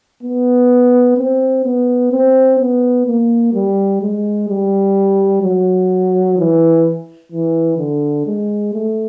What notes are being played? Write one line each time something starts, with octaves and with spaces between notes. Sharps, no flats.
B3
C4
B3
C4
B3
A#3
G3
G#3
G3
F#3
E3
E3
D3
G#3
A3